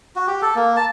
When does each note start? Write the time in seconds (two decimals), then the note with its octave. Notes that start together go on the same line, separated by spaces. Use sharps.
0.16 F#4
0.27 G4
0.42 A4
0.56 A#3
0.76 A5